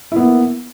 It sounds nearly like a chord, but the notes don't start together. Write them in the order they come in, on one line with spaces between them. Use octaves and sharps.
E4 B3 A#3